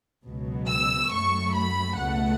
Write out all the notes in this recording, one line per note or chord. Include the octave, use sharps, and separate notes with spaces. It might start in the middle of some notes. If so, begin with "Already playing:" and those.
C#2 B2 F#3
E6
F#2 F#3 A3 C#6
B5
C#2 B2 A3 F#5